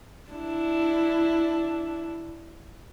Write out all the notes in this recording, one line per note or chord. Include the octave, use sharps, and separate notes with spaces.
D4 E4